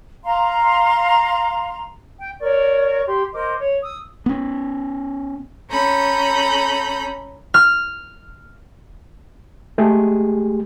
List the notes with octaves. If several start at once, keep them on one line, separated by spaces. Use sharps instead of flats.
F5 A#5 C6
G5
A#4 C#5 D5 C#6
G4 C6
A#4 C5 D#5 D6
C#5
D#6 E6
B3 C#4
C#4 A4 A#5 B5 G6
F6
G#3 A3 G4 G#4